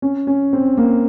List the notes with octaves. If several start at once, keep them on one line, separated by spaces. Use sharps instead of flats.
C#4
C#4
C4
A#3